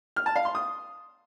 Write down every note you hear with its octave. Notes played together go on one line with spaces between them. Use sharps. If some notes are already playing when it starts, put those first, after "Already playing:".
F6
A5
F5
C6
D#6